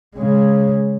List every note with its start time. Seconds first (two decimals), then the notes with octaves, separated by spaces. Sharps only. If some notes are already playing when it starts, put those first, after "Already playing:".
0.16 C#3 G#3